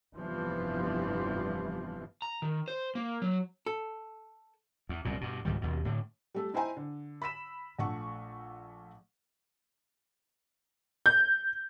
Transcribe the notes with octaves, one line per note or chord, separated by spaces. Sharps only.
F1 G2 E3 F3 G3 B3
A#5
D#3
C5
A#3
F#3
A4
E2
C2 F#2 A#2
G2 B2
C#2 G#2 D#3 G3
D#2 B2
A2 D3
G3 A3 A4
D#4 E4 C5 G5 G#5 A#5
D3
B5 E6 B6 E7
A#1 A3 F#5 C#6
G6